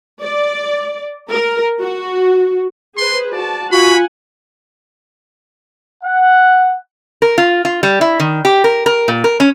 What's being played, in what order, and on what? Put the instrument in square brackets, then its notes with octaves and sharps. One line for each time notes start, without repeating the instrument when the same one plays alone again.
[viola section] D5
A#4
F#4
[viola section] G#4 B4 C5 [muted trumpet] C6
[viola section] F#4 A5 [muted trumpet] D5
[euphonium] F4 [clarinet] F#4 [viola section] F#5 G#5 [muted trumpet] B5
[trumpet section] F#5
[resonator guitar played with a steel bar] A#4
F4
F4
G3
E4
D#3
G4
A#4
A#4
A#2
A#4
C#4